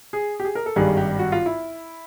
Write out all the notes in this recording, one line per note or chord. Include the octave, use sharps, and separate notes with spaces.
G#4
G4
G#4
A#4
A4
G#1 G2 D#3 G3 G#4
G4
F#4
F4
E4